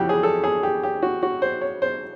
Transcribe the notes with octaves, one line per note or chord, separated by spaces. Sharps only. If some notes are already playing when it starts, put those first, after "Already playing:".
Already playing: F2 C#3 E3 F#4 G4
G#4
A4
G#4
G4
G4
F#4
F#4
C5
C#5
C5